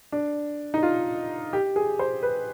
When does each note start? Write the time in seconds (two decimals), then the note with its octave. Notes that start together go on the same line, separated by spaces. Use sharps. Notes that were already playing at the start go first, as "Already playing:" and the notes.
0.12 D4
0.74 D#4
0.83 F4
1.53 G4
1.76 G#4
1.99 C5
2.23 B4